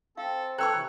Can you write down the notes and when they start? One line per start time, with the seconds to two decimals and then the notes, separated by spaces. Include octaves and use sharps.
0.17 C4 A4 F5
0.58 A4 B4 C#5 G5 A#5 C#6 E6 F#6
0.72 C3 E3